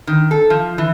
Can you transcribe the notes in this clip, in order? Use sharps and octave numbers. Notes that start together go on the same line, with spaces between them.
D#3
A4
F3
E3